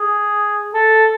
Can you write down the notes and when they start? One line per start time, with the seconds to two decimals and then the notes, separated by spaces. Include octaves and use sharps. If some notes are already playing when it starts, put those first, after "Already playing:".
Already playing: G#4
0.74 A4